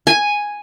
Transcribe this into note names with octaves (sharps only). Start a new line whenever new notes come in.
G#5